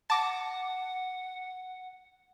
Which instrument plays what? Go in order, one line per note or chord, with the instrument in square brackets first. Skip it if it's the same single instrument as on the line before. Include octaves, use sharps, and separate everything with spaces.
[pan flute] F#5 [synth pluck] A5 D6 A#6